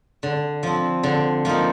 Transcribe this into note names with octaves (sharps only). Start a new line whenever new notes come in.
D3
F3 C4
D3
F3 A#3 D#4